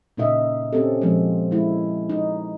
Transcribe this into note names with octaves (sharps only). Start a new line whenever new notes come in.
A#2 C#3 D#4 F4 D#5 E5
C4 C#4 G4 A4
A#2 F3 G#3 C4
G#3 E4
D#4